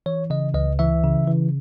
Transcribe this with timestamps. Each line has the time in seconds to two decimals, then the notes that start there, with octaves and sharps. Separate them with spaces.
0.06 E3 C#5
0.30 C#3 D#5
0.54 C#2 D#5
0.79 E3 E5
1.04 C#3
1.27 E3